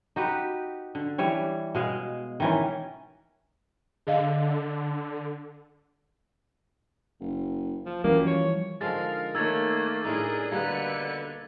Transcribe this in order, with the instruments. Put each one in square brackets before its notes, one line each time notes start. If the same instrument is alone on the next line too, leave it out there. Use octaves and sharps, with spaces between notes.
[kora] D#4 F#4 G4 B4
D3
E3 G3 C#5
B2 G#3 F5
D#3 E3 C#4
[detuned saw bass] D3 [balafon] G#4 D#5 F5
[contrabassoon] F#1
[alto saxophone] F3
[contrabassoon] F#2 [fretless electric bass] E3 F3 G3 [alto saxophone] A#3
[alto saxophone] C#5
[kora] D3 F3 G#3 [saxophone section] D#4 G#4 A#4 [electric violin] F5 [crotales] A6
[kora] D#3 C#5 [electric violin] A3 A#3 [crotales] E6 G#6 A6
[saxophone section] F#2 G3 D4 [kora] A2 D#4 [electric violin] G#4 A#4
[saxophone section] D#2 B2 D3 [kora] G3 A#3 [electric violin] B4 C#7